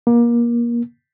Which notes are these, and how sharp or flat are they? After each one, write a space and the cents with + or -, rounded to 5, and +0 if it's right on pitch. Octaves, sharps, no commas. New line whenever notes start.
A#3 +25